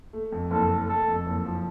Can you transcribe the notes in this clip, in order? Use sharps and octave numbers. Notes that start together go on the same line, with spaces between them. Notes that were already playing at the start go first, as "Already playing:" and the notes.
A3
F2
F#1 A4
A3
A3 A4
F2
F#1
F3